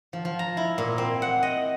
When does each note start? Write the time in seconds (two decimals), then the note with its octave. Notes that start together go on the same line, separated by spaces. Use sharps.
0.13 F3
0.25 F3
0.39 A#5
0.57 E4
0.78 A#2
0.98 C4
1.22 F#5
1.43 D#5